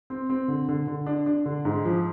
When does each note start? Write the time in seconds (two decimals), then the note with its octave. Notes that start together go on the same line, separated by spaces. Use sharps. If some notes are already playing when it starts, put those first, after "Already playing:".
0.10 C4
0.30 C4
0.48 D3
0.68 D3
0.87 D3
1.06 D4
1.26 D4
1.46 D3
1.65 G#2
1.85 F3